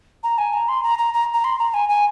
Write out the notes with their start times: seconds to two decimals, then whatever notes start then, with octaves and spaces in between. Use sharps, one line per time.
0.23 A#5
0.38 G#5
0.53 A#5
0.68 C6
0.83 A#5
0.98 A#5
1.14 A#5
1.34 A#5
1.44 C6
1.59 A#5
1.74 G#5
1.89 G#5